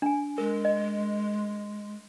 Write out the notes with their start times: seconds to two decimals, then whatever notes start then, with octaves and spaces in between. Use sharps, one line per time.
0.02 D4 G#5
0.38 G#3 A#4
0.65 D#5